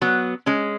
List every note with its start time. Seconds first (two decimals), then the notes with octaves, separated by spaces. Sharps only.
0.01 F#3 B3
0.46 G#3 C#4